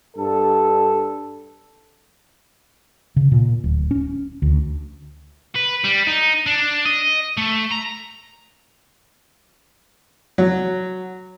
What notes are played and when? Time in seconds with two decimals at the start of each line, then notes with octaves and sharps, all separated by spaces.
0.16 G2 A4
3.16 C#3
3.32 A#2
3.64 D1
3.91 C#4
4.42 D2
5.55 B4
5.84 G3
6.07 D#4
6.46 D4
6.85 D#5
7.37 A3
7.72 A#5
10.38 F#3